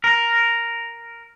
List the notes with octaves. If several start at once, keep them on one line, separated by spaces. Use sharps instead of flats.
A#4